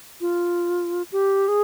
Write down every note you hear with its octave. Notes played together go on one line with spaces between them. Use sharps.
F4
G4
G#4